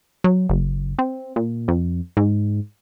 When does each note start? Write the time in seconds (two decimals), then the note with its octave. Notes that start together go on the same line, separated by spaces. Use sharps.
0.24 F#3
0.49 F#1
0.99 C4
1.36 A#2
1.68 F2
2.17 G#2